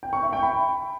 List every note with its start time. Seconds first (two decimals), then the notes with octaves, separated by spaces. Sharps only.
0.03 G5
0.13 C#6
0.23 E5
0.33 G5
0.43 B5